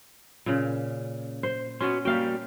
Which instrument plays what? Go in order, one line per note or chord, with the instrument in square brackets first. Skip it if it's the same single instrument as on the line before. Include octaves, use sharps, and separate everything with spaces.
[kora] A#2 C#3
C5
[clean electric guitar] B3 F#4 C6 [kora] C#4
[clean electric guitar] G3 A#3 F#4 [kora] G4 F5 G5